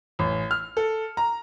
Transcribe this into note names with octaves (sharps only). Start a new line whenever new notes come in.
A1
F6
A4
A#5